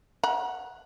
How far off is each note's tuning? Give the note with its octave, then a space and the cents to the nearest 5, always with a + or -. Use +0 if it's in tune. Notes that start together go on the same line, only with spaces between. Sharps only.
F#5 +0 A#5 +40